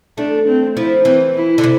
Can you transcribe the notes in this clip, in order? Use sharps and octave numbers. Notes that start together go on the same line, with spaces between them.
A3 D4
C4
F3 E4
E3 C4
E4
D3
C3